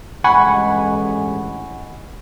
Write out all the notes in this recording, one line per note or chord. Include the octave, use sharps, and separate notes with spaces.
A1 G2 G#3 F#5 G#5 B5 C#6